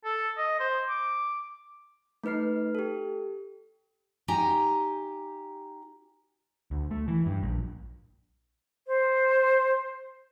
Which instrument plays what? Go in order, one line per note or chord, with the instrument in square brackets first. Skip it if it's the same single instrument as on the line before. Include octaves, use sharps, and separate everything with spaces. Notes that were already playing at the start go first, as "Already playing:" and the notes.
[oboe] A4
D#5
C5
D6
[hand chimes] A3 D#4 B4 F6 C7
G4 A4
[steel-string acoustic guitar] D#4 G4 G#5 A#5
[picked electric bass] D2
A3
E3
G2
A#1
[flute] C5